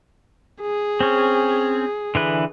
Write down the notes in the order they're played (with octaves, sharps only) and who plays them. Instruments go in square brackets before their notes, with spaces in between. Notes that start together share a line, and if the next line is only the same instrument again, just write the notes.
[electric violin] G#4
[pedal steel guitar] C4 C#4
D3 E3 B4